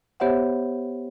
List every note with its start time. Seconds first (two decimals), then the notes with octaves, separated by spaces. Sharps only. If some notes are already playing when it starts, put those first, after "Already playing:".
0.20 B3 G4 C5 C#5 E5 F#5